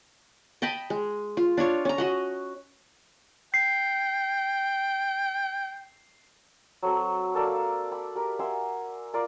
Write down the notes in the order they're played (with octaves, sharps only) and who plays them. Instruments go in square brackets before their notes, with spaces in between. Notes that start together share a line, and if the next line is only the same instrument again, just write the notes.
[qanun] D#5 G5 A5 B5
G#3
F4
D4 F4 C#5 F5
C#4 A#5
F#4 D#5 F#5
[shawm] G5 [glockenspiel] C7
[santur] F#3 C4 A4
A#3 A4 D5 F5
B5
G4 A#4 B5
E5 F#5 G#5 C6
F4 A#4 D5